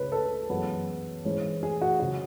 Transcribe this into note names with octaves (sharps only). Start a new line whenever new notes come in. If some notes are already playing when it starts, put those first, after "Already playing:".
Already playing: C#2 C#3 G#3 C#4 B4
A4
F#2 E3 G#3 B3
G#2 E3 G#3 C#4
G#4
F#4
C#3 F#3 F#4